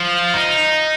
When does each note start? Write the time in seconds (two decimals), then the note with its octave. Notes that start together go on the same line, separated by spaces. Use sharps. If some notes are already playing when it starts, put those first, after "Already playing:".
Already playing: F3
0.34 D#4